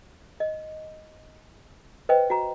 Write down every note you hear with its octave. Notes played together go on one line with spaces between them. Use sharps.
D#5
B4 C5 D#5 G5
F#4 A#5